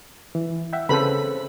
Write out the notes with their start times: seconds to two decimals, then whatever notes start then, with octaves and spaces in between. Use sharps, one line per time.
0.35 E3
0.73 E5 F#5 G5
0.89 C#3 C4 A4 B4 C5 B5